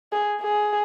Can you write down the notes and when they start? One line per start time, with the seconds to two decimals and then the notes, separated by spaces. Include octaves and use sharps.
0.12 G#4
0.42 G#4